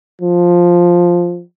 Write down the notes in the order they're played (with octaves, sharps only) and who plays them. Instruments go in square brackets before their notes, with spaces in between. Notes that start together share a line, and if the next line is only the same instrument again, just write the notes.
[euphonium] F3